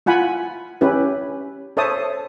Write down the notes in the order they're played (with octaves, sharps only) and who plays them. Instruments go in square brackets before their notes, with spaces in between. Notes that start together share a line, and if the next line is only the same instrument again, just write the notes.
[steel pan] E4 F4 F#5 G#5 B5
C#4 E4 G4 B4
A4 C5 C#5 E5 A5 D#6